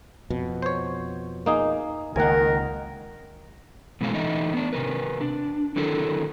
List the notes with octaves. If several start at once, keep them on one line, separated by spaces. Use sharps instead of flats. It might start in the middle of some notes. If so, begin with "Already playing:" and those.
F2 B2
C5 C#5
A#3 D#4 G#4
C#2 D#3 A#3 A#4 F#5 G#5
B2 E3 G#3 A3 C4 F5
E3 A3 D#4 D#5 E5
B3 D4
C3 F#3 A#4 B4
D4
D3 D#3 F#3 E4 A4 A#4